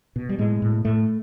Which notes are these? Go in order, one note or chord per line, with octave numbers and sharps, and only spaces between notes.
B2
G3
A2 G#3
A2
A2 A3